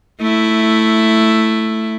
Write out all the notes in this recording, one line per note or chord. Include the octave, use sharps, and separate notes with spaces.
A3 E4